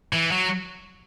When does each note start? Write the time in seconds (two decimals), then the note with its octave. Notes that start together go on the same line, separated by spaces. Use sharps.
0.13 E3
0.32 F#3